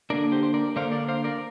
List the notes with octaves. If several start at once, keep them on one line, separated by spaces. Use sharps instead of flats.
D3 A#3 D4 A#4 D5
G4 C5
C5
A#4 D5
D3 A#3 D4 C5 F5
A#4 D5
C5 F5
A#4 D5